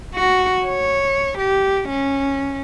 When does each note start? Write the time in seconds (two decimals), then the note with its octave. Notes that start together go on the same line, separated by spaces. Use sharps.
0.15 F#4
0.65 C#5
1.38 G4
1.89 C#4